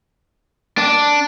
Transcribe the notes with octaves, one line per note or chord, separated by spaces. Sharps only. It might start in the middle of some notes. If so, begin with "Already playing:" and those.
D4